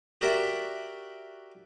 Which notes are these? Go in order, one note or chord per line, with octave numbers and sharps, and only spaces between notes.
F#4 G4 A#4 D5 E5 F#5